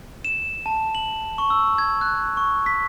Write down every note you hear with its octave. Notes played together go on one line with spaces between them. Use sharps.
E7
A5
F#7
C#6
E6
G#6
F#6
C#6
B6